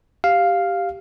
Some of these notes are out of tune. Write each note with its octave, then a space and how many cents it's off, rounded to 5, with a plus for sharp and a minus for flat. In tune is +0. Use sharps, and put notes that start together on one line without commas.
G4 +0 F5 +0